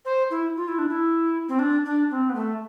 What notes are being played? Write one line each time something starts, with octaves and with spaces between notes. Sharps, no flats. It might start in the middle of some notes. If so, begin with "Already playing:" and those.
C5
E4
F4
E4
D4
E4
C4
D4
D4
C4
B3
A3